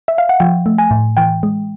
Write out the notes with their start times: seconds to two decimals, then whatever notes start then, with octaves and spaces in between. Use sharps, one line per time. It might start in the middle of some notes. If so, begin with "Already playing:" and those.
0.08 E5
0.18 F5
0.29 F#5
0.40 F3 G5
0.66 A3
0.78 G#5
0.91 A2
1.17 E3 G5
1.43 G#3